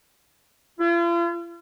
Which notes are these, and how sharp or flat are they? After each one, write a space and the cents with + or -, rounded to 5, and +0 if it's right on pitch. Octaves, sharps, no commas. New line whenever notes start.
F4 -45